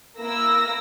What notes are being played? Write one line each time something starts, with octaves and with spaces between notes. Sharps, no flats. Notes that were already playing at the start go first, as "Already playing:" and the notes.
A#3 E4 E6 A#6